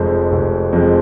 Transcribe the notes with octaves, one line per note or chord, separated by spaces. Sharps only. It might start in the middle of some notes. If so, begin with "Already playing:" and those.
Already playing: F1 F2 F3 G#3 C5
F1
F2 F3 G#3